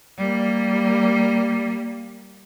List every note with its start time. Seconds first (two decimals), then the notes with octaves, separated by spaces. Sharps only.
0.18 G3 A#3